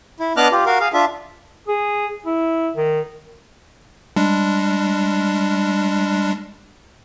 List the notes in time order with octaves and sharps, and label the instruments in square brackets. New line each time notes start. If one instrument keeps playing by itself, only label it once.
[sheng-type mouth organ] E4
B3 D4 D#5 D6 F6 F#6
F4 G4
F#4 A#4 F5
G#4 F5
D4 F4 E5
[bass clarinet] G#4
E4
D#3
[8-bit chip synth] G3 G#3 D4